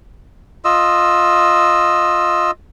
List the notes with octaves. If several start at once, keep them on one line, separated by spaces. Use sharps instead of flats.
F4 D#5 E6